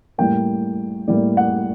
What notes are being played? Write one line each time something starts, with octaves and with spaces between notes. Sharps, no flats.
A2 G3 A#3 G5
A2 G3 A#3 D5
F#5